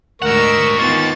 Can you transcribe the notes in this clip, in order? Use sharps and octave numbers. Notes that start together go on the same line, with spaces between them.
D2 G#2 A#4 D#5 F#5 C#6 E6
D#3 A#3 B3 F4 A6